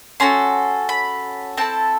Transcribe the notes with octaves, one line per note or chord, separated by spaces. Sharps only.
C#4 F#4 A4 C6
B5
C4 E4 A4 A5